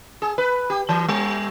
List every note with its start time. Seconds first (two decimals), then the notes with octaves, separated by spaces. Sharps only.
0.22 G#4
0.38 B4
0.70 G4
0.89 E3
1.09 G3